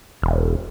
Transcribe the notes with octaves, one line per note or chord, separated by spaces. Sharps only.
E1